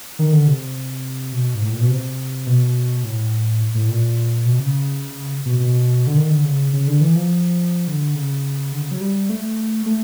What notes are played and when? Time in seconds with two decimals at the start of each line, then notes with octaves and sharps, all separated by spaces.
0.19 D#3
0.33 D3
0.48 C3
1.33 B2
1.55 G#2
1.64 A2
1.72 A#2
1.81 B2
1.90 C3
2.47 B2
3.03 A2
3.75 A2
3.89 A#2
4.45 B2
4.59 C#3
5.45 B2
5.60 B2
6.07 D3
6.16 D#3
6.30 D3
6.45 C#3
6.73 C#3
6.87 D3
7.01 E3
7.16 F3
7.88 D3
8.15 C#3
8.72 D3
8.82 C#3
8.91 F#3
9.01 G3
9.29 A3
9.86 A3